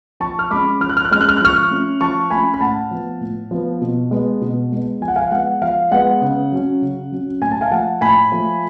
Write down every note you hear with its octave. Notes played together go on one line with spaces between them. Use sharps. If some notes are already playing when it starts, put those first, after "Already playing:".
F3 A5 C#6
F6
G#3 C#4 B5 D6
F3 F6
F#6
F6
F#6
G#3 C#4 F6
F#6
F6
F#6
F3 C#6 F6
A3 C#4
F3 A5 C#6
A3 C#4 G#5 B5
B5
A2 F#5 A5
F3 B3
A2
F3 B3
B2
G#3 B3
B2
G#3 B3
F3 G#5
F#5
F5 G#5
G#3 B3 F#5
F3 F5
G#3 B3 F#5
C#3
F#3 C#4
C#3
F#3 C#4
A2 G#5
A5
F5 G#5
F3 A3 F#5 A5
A2 G#5 B5
F3 A3